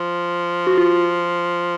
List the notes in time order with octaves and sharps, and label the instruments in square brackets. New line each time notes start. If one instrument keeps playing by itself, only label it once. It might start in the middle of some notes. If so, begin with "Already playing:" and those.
Already playing: [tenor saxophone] F3
[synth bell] F#4
F4